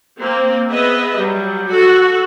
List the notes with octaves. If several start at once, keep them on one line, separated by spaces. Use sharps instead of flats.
A#3 C4
B3 G#4 B4 D#5 E5
F#3 G3
F#4 A4